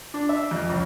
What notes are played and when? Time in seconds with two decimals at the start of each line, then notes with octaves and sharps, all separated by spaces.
0.14 D4
0.29 E5
0.51 F2
0.69 C#2